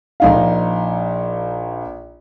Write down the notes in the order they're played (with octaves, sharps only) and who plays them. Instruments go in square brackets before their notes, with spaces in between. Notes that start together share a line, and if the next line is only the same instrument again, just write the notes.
[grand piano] A#1 D#4 F5